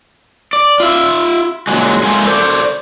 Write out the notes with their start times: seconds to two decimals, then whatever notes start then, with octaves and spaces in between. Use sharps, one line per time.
0.53 D5
0.80 F4 E5
1.67 A#2 F#3 G#3
2.04 G#3 A3 B3 F4 A#4 G#5
2.26 A4 C5 D5